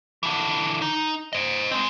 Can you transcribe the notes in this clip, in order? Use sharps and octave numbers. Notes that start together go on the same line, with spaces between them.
D3 E3
D#4
C5 D#5
G#3 C4